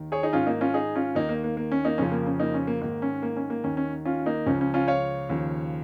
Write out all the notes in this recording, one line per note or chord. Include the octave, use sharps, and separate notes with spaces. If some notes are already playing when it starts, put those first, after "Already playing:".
Already playing: D#2 D#3
G#4 C#5
D#4 G#4
G#2 D#3 C#4 F4
A#3 D#4
C#4 F4
D#4 G#4
C#4 F4
D#2 D#3 A#3 D#4
A#3
A#3
A#3
C#4
A#3 D#4
F2 C#3 F3 C#4
A#3
C#4
A#3 D#4
C#4
A#3
G#2 D#3 A#3
C#4
A#3
C#4
A#3
D#2 D#3 C#4
C#4
C#4 F4
A#3 D#4
C#2 C#3 F3 C#4
C#4
C#4 F4
C#5 F5
D#2 C#3 F3